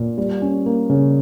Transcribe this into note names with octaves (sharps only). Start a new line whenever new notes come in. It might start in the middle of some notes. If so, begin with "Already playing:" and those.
Already playing: A#2
G3
C#4
A#3
C#3